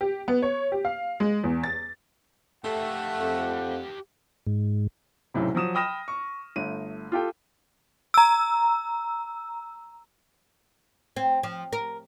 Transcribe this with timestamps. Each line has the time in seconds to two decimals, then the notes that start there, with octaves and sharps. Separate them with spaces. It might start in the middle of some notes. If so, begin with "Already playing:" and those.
0.01 G4
0.28 B3
0.42 C#5
0.72 G4
0.85 F5
1.20 G#3
1.44 E2
1.64 A6
2.65 A3 G4 F5 F#5
3.18 F2
4.47 G#2
5.34 B1 F#2 A2 C3
5.55 F3 F#3 D#6 E7
5.75 G5 B5 D#6 F6 A#6 E7
6.08 C#6
6.56 G1 A3 D#7
7.12 F4 G4 A4 G5
8.14 A#5 E6
11.16 C4
11.43 F3
11.73 A#4